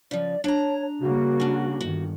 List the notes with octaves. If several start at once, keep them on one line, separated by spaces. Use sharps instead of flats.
C#3 F3 D5
D4 C#5 A5 A#5
C#3 G3 A#3 F#4
C#4 D4
G1 D#3 F#4